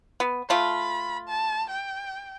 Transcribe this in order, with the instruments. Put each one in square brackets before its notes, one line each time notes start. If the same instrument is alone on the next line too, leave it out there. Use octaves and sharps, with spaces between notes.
[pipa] B3
[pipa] A3 F4 [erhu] B5
[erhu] A5
G5